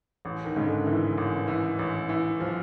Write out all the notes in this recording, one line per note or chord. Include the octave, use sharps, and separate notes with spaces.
A1
D#3
G#2 C#3
D3
D#3 E3
A1
E3
A1
E3
F3